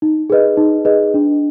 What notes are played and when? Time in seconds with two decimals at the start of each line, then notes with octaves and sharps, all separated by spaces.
0.02 D#4
0.30 G#4 B4 D#5
0.57 D#4
0.85 G#4 B4 D#5
1.14 D4